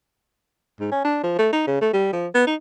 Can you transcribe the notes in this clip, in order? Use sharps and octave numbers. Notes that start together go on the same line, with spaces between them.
G#2
C#4
D4
F3
A3
D#4
C#3
A3
G3
F3
B3
D#4